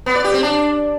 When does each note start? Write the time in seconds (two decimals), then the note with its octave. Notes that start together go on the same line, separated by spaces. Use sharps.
0.06 B3
0.15 D5
0.25 G4
0.34 C4
0.43 D4